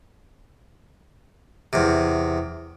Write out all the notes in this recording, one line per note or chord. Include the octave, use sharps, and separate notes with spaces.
E2 C3